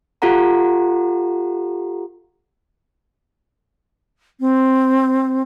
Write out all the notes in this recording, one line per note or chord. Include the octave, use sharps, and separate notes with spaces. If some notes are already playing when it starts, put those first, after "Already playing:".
F4 G4 A4 F#5 A#5
C4